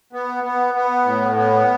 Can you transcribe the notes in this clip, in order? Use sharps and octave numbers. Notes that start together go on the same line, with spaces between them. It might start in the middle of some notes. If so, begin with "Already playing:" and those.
B3
B3
B3
A2
B3